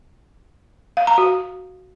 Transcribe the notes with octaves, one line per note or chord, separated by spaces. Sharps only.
F5
A#5
F#4